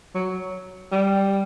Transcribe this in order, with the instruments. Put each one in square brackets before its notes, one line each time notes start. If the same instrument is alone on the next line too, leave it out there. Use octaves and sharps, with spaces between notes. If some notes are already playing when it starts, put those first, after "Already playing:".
[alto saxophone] F#3
G3